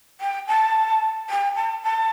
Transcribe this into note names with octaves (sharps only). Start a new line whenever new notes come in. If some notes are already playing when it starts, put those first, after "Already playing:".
G5
A5
G5
A5
A5